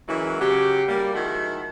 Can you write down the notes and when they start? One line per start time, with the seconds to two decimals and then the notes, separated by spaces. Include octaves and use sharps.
0.09 E3 F#3 G#3 A#3 C#4 E4
0.40 C#3 F#3 F#4 G4
0.88 G3 A#3
1.14 D#3 F3 G#3 E4 F#4